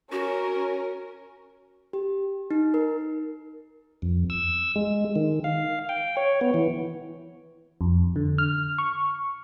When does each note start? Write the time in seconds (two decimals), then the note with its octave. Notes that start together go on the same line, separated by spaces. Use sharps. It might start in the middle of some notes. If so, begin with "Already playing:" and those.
0.12 C#4 F#4 A#4
1.93 G4
2.51 D#4
2.74 A#4
4.02 F2
4.30 E6
4.76 G#3
5.16 D#3
5.44 F5
5.89 G5
6.17 C#5
6.41 B3
6.54 E3
7.81 F2
8.16 D3
8.38 F6
8.78 C#6